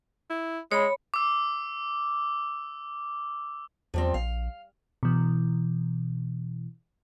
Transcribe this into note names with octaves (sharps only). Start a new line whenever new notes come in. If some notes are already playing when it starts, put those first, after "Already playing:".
E4
G#3 C#5 B5
D6 E6
E2 F3 G3 C4
A#1 F5
B2 E3